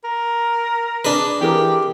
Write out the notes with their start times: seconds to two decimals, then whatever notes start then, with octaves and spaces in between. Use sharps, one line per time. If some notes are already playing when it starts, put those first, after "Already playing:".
0.04 A#4
1.05 D4 G#4 B4
1.41 E3 G4 G#4 A#4